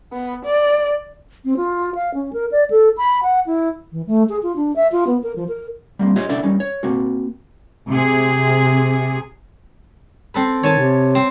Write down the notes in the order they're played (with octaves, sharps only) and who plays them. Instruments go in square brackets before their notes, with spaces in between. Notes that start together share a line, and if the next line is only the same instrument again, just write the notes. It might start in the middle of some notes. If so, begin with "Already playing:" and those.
[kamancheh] B3
D5
[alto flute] C4
F4
F5
C#4
A#4
D5
A4
B5
F#5
E4
[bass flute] E3
A3
G#4
F4
D4
E5
F4
B3
A#4
F3
A#4
[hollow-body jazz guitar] G3 A#3 C4
F4 G4 C#5 D#5
C#4 D4 E4 A4 D5
G3 C#4 D#4
C#5
A#3 C4 F#4
[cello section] C3 G#4
[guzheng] C4 A4 B4
[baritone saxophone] D#3 [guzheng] C#5 G#5 A5
[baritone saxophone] C3
[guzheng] C4